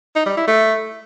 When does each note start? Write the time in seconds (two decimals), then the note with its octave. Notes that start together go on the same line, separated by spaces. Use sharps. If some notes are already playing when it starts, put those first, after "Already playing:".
0.16 D#4
0.26 G3
0.37 E4
0.47 A3